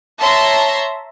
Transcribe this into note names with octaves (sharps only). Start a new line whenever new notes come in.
C#5 E5 A5 A#5 C6